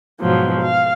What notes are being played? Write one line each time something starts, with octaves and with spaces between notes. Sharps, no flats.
G#2 B2 F3 F#3
F5